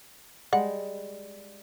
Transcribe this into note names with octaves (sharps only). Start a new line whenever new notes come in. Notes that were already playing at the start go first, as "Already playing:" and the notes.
G3 G#3 F#5